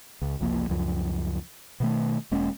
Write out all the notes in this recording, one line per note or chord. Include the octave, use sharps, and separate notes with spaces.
C#2
F#1 C2 F3 A#3
C#2 F#2 F3
B2 D#3 A3
E1 G#3 A#3 C#4